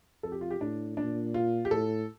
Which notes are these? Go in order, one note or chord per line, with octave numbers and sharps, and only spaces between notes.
F2 A4
G4
F4
G4
A2 D4
A#2 D4
F4
G4
A2 A4